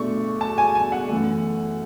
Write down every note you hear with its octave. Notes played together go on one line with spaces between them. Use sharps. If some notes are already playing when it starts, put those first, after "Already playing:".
Already playing: B2 A3 D4 C#6
A5
G#5
G#5
F#5
F#2 E3 A3